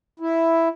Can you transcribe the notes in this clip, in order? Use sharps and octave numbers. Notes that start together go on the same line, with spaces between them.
E4